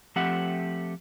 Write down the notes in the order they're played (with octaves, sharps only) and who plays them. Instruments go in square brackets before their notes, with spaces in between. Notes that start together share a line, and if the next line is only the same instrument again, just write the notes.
[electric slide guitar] F3 A3 C4 G4 E5 F#5